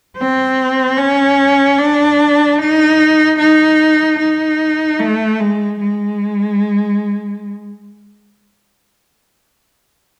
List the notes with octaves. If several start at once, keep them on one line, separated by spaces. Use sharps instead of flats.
C4
C#4
D4
D#4
D#4
D#4
A3
G#3
G#3